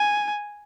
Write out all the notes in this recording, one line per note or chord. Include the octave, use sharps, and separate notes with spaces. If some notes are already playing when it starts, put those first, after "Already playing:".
Already playing: G#5